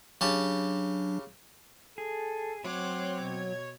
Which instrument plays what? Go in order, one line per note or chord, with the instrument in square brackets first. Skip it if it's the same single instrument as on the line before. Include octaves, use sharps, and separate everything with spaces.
[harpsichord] C#3 G4 A5 [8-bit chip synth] F#3 D4
[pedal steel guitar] G#4 [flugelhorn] A4
[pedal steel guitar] F#3 [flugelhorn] C4 [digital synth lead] C#5 [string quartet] C6 D6 F#6
[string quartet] B2 G#6